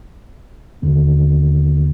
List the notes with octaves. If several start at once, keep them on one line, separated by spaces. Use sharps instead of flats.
D#2 D3 A#3